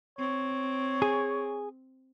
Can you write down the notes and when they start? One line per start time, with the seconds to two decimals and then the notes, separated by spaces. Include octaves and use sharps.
0.19 C4 C#5
1.02 G#4